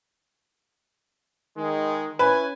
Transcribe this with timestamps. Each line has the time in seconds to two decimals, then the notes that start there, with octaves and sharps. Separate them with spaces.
1.57 D#3 G#3
2.19 C#4 E4 B4 G#5